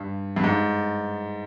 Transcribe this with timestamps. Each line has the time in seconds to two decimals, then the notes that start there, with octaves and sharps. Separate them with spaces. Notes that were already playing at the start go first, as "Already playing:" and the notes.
Already playing: G2
0.36 G2
0.44 G#2